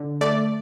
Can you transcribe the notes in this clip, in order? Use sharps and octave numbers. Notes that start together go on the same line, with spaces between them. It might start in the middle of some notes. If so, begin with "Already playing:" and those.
Already playing: D3
A3 D5